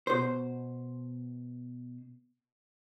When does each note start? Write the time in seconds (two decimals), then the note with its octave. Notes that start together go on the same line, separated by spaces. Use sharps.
0.07 B2 C5